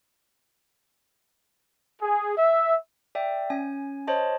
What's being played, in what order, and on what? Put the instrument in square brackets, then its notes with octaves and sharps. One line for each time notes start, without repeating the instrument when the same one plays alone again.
[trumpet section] G#4
E5
[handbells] D5 E5 G5
C#4 G#5
C5 C#5 D#5 A5